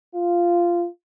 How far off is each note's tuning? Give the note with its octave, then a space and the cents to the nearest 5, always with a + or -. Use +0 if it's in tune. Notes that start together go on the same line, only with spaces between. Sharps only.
F4 -10